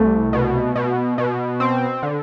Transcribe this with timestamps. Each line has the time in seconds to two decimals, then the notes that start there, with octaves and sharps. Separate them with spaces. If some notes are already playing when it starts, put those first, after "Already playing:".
Already playing: C2 A3
0.33 B2
0.76 B2
1.18 B2
1.60 C4
2.03 D3